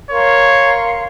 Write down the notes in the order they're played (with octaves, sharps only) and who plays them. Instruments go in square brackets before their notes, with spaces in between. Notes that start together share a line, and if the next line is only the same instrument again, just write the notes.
[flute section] A#4 F5 C6 [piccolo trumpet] C#5